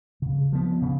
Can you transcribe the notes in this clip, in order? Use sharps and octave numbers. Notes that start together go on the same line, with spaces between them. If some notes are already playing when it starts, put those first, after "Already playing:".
C#3
F3 B3
C#3